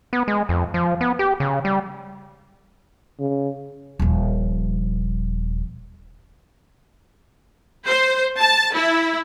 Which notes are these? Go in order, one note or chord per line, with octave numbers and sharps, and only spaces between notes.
B3
G#3
F2
F3
B3
G4
C#3
G3
C#3
D#1 F3
C5
A5
E4